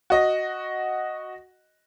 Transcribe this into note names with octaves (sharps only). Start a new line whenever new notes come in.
F#4 D#5